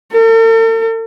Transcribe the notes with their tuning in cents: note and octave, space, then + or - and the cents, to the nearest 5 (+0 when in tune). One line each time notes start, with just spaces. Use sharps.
A4 +45